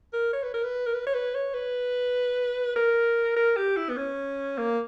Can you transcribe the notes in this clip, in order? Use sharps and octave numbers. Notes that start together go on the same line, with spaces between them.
A#4
C#5
B4
A#4
B4
A#4
B4
C#5
B4
C#5
B4
A#4
A#4
G4
E4
B3
C#4
A#3